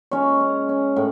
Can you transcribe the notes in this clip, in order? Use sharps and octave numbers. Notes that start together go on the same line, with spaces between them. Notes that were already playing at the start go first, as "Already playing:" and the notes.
G#3 C#4 C#5
C#4
C#4
A2